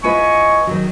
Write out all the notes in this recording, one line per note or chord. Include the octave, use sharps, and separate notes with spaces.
E4 F4 B4 D#5 G#5 C#6
D#3 E3 F#3